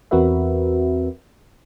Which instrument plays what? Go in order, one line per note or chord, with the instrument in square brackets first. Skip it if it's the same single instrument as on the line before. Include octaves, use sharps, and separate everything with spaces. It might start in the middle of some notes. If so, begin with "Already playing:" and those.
[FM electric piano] E2 C4 F#4 A#4 B4 E5